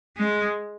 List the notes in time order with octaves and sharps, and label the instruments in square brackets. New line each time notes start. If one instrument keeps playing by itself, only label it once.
[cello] G#3